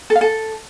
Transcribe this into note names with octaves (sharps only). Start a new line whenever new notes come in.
A4
F5
A4